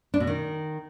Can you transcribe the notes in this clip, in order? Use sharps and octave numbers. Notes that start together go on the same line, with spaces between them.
D4
B2
D#3